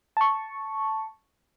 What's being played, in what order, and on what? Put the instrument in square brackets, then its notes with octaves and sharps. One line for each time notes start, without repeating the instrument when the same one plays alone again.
[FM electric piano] A5 C#6